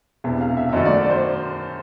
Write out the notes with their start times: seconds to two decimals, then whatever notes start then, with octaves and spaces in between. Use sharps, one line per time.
0.24 E1 E2 C3 E5
0.41 F5
0.57 E5
0.69 E5
0.72 F#2 D#3 F#3 A3 D#5
0.85 D5
0.97 D5
1.10 C5